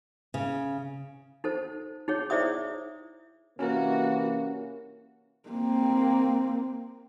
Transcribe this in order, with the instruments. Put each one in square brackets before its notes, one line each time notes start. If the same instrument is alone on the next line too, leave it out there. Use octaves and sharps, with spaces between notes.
[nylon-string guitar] C#3
[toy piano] D#4 A4 C5
D#4 G#4 C#5
E4 G#4 C5 D5 E5 D#6
[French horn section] C3 E3 A#3 [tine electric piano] C#4 A#4 [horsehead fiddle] F#4
[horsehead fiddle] A#3 C4